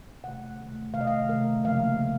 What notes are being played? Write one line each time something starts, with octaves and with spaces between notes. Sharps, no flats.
C3 D#3 A3 F#5
C3 D#3 A3
C3 D#3 A3 F5
D#5
F5
C3 D#3 A3 A#4
C#3 F3 A#3 F5
C#3 F3